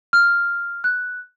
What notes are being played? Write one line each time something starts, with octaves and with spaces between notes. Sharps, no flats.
F6
F#6